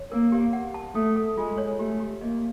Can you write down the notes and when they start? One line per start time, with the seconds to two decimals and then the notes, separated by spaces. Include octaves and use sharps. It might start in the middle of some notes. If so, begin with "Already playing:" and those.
Already playing: C#5
0.12 A#3 A#4
0.32 G4
0.53 F#5
0.74 A5
0.95 A3 A4
1.16 A4
1.37 G#3 F4
1.58 C#5
1.79 A3 G4
2.00 G4
2.21 A#3 D#5